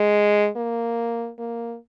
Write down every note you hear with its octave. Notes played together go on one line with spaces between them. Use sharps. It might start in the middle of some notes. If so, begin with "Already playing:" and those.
Already playing: G#3
A#3
A#3